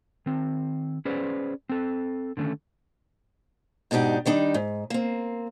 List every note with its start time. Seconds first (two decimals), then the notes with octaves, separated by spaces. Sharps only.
0.26 D#3 C4
1.05 C#4 G#4 B4 C5 D5
1.69 C4 A4
2.37 D3 D#3 A3 C#4
3.91 G#2 B2 D4 D#4 G4
4.26 D#3 G3 D4 D#4
4.54 G#2
4.90 A#3 C4